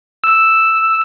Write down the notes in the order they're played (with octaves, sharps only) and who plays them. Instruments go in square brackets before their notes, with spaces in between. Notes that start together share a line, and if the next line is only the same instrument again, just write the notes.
[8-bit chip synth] E6